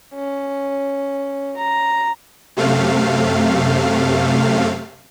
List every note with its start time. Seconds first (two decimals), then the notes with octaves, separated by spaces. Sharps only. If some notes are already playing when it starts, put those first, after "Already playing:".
0.15 C#4
1.57 A#5
2.57 F#2 C3 A3 F5